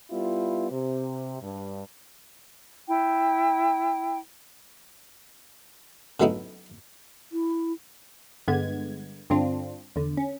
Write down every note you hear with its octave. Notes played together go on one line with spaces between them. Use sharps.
G3 B3 E4 F4
C3
G2
E4 G5
C#3 F#3 A3 B3 D#4 E4
E4
G2 D3 G#3 B3 G#6
G2 D3 C4 D4 F4
E2 D3
C#4